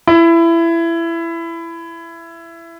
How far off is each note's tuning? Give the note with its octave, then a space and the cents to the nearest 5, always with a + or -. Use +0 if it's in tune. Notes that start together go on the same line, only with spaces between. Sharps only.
E4 +20